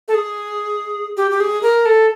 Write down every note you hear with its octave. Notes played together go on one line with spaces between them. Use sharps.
A4
G#4
G4
G4
G#4
A#4
A4